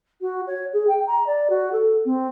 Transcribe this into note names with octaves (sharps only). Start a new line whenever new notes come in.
F#4
C#5
G#4
G5
A#5
D5
F#4
A4
C4